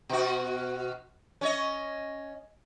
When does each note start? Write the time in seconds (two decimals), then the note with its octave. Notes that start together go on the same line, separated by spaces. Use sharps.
0.09 B2 F#4
1.41 C#4 C#5 D#5